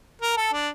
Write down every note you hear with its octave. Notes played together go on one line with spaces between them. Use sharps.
A#4
A4
D4